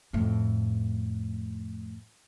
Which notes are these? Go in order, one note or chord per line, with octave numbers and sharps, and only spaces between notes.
F2 A2